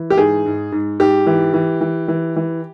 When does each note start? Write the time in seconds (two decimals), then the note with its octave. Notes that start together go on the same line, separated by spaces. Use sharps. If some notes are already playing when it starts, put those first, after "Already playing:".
Already playing: E3
0.10 G4
0.18 G#2 G#4
0.45 G#2
0.72 G#2
1.00 G#2 G4
1.26 E3
1.54 E3
1.81 E3
2.08 E3
2.36 E3